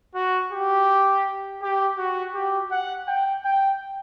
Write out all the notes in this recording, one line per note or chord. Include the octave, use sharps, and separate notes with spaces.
F#4
G4
G4
F#4
G4
F#5
G5
G5